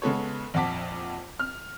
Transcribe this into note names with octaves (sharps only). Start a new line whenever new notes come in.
C#3 G#3 B3 A4 B4 C#5
A#1 F2 F#5 A5 D6 B6
F6